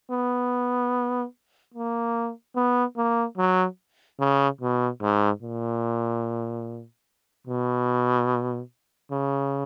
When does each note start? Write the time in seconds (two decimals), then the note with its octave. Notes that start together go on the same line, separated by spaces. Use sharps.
0.11 B3
1.74 A#3
2.56 B3
2.97 A#3
3.38 F#3
4.20 C#3
4.61 B2
5.02 G#2
5.42 A#2
7.47 B2
9.11 C#3